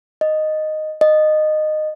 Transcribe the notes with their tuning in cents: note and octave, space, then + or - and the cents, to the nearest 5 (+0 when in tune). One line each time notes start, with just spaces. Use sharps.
D#5 -5
D#5 -15